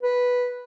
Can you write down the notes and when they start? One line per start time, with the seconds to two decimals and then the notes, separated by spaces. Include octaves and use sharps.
0.03 B4